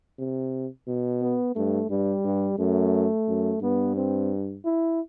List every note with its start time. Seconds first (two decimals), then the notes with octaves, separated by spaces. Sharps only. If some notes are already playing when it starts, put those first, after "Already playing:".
0.19 C3
0.87 B2
1.22 B3
1.55 G2 A3
1.90 G2 G3
2.24 G2
2.58 F#2 A3
3.28 F#2
3.61 G2 B3
3.96 C4
4.65 E4